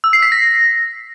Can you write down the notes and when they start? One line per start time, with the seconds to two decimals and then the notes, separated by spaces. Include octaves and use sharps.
0.04 E6
0.13 C7
0.22 B6
0.32 A#6